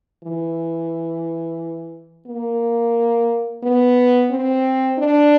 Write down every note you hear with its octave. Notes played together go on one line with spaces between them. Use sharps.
E3
A#3
B3
C4
D4